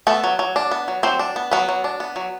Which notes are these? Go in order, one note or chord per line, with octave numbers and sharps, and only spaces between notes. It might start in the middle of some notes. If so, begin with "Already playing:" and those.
A3 B3 A4
F#3
F#3
D4
B3
F#3
F#3 C4 C5
D4
B3
F#3 B3 B4
F#3
D4
B3
F#3